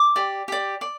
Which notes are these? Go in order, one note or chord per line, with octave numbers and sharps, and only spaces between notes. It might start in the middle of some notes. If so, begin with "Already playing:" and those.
Already playing: D6
G4 D5
G4 D5
D5